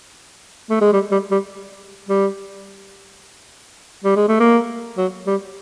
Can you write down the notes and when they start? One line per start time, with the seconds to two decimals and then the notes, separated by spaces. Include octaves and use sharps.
0.70 A3
0.82 G#3
0.93 G3
1.11 G3
1.31 G3
2.09 G3
4.04 G3
4.16 G#3
4.28 A3
4.40 A#3
4.98 F#3
5.27 G3